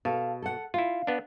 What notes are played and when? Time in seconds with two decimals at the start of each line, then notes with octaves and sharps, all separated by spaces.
0.05 B2 A4 F5
0.42 A4 F#5
0.74 E4 F4 F5
1.07 B3 D4